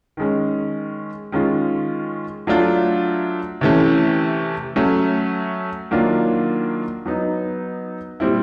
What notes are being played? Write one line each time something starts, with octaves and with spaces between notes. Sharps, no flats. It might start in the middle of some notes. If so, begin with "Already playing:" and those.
D#3 G#3 C#4
D#3 G#3 C#4 F4
F#3 A3 D4 F4
C3 E3 A3 C#4
F#3 A3 C#4
D#3 F#3 A#3 D4 F4
F#3 B3 D#4
A#2 G3 C4 E4